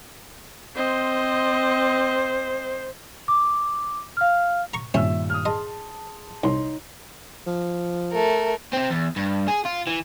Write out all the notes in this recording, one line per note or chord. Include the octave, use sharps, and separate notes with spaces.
C4 C5 D#5
D6
F5 F6
A#5 C#6
G2 A#2 D#3 C4 C#4 E5 A5 E6
D#6 F6
G#4 D#5 A5 C6
C2 D#4 C#5 C6
F3
A3 A#4
C3 C4
E2
G2
G#4
F4
E3